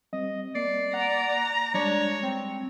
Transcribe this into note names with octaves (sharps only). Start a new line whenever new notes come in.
G3 C4 D#5
A#3 D5 C7
F#5 A#5
G3 G#3 D4 C#5
C4